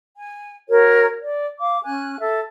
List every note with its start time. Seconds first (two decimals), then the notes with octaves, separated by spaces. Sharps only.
0.16 G#5
0.69 F#4 A#4 C#5
1.22 D5
1.59 F5 D6
1.84 C#4 G#5 F#6
2.20 A4 E5